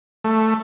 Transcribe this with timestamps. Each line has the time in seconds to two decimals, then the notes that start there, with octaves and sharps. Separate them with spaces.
0.24 A3